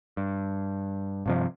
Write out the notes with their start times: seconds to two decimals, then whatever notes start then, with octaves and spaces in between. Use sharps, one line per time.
0.17 G2
1.26 G2 C3 F3